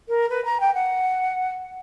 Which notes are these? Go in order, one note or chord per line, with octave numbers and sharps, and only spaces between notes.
A#4
B4
A#5
G5
F#5